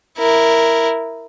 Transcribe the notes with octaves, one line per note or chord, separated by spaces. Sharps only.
E4 A#4